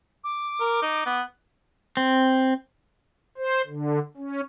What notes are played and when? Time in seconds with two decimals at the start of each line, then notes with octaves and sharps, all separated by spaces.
0.24 D6
0.60 A#4
0.82 D#4
1.06 B3
1.97 C4
3.37 C5
3.67 D3
4.17 C#4